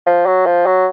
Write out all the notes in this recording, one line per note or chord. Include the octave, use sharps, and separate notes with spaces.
F3
F#3
F3
F#3